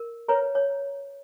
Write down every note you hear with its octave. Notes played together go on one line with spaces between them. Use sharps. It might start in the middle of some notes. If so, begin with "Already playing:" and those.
Already playing: A#4
A#4 B4 C#5
C#5